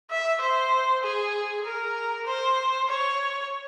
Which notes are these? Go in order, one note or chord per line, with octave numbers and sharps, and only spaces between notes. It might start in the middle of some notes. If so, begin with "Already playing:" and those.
E5
C5
G#4
A#4
C5
C#5